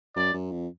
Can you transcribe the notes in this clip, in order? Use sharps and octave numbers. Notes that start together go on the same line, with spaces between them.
F#2 D5
F#2
F2